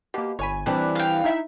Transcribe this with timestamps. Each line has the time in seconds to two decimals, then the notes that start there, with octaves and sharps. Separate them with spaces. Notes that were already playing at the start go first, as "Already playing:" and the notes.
0.14 B2 A#3 G4
0.39 G1 C#5 G#5 B5
0.66 E3 G3 C4 D4 G4 D5 F#6
0.95 F5 G5
1.24 D#4 E4 E5